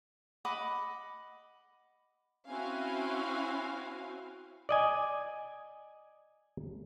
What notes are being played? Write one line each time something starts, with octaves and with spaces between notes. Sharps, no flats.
D#5 F#5 B5 D6
C4 C#4 E4 F#4 F5 G#5
D5 D#5 G#5